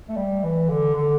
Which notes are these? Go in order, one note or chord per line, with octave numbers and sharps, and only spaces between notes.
A3
G3
E3
D3
D3